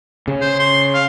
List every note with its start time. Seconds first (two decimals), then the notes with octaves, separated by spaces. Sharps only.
0.28 C#3
0.41 C5
0.59 C6
0.94 F5